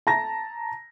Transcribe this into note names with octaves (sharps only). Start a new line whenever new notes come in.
A5 A#5 A#6